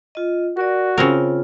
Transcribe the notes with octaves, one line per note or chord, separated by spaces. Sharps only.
F4 D#5
F#4 A#4 D5
C#3 C4 F4 A#4